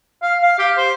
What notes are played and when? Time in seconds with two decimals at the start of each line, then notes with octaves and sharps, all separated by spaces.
0.23 F5
0.43 F5
0.58 G4
0.78 C5